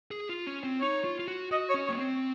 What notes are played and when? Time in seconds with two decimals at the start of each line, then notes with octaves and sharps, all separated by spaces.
0.11 G#4
0.29 F4
0.47 C#4
0.64 C4
0.81 D#4 C#5
1.04 F4
1.19 F4
1.28 F#4
1.51 F#4 D#5
1.69 C#5
1.74 C#4
1.86 A#3 C#5
1.98 C4